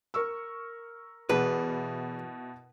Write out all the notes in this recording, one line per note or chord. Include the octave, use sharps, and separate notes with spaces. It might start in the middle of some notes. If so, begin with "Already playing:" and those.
A#4 C#6 E6
E2 B2 E4 B4